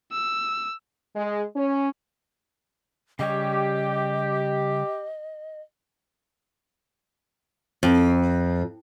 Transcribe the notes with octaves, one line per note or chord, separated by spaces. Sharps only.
E6
G#3
C#4
C#3 G3 G4 C#5 D#5
F2